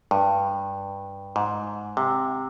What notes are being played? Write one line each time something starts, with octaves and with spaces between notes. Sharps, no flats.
G2
G#2
C3